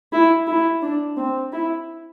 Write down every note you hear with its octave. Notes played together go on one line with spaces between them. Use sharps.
E4
E4
D4
C4
E4